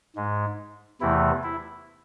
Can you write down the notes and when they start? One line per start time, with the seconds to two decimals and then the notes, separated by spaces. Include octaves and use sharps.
0.16 G#2 G#3
1.01 E2 C3 E3 A3 E4
1.43 E4